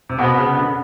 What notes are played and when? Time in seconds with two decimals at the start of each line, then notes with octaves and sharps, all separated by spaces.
0.09 C3
0.18 B2 B3
0.38 C#3
0.57 D3